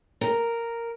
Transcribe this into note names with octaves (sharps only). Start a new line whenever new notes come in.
A#4